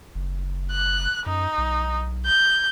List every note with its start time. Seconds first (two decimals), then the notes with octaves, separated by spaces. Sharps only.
0.15 F#1
0.71 F#6
1.26 F#2 D#4
1.58 B1
2.26 G6